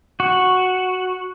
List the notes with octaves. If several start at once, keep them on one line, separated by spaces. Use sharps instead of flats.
F#4